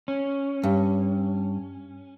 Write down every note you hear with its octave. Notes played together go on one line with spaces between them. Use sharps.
C#4
G2